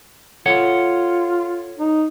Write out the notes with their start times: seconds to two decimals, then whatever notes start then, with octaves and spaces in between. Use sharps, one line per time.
0.46 F4 A4 C#5 F#5
1.79 D#4